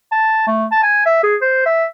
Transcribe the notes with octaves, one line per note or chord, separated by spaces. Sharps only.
A5
A3
A5
G#5
E5
G#4
C5
E5